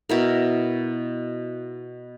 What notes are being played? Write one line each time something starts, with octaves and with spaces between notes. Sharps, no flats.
B2 E4 A#4